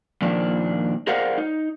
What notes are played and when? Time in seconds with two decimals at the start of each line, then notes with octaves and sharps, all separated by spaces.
0.22 A#2 D#3 F3 D4
1.07 G#4 A#4 C5 D5 F5 F#5
1.38 D#4